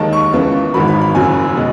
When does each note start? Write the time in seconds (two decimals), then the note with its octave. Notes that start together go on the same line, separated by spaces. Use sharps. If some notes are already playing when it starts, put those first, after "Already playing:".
Already playing: D#2 D#3 G#3 A5
0.13 C#6
0.33 C#2 C#3 E3
0.74 G#1 G#2 D#3 F#3 B5
0.88 B5
1.02 B5
1.15 F#1 F#2 C#3 F#3 G#5
1.57 B2 G#3